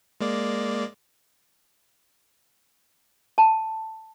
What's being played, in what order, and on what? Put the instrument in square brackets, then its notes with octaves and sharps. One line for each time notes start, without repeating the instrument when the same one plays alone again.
[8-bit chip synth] G#3 A#3 D5
[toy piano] A5